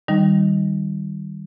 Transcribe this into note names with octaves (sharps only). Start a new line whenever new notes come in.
D#3 G3 D#4